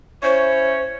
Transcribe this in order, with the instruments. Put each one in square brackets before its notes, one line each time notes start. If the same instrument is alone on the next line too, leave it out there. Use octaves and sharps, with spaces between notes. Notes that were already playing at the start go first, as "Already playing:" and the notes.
[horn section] C#4 E4 C#5 [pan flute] C5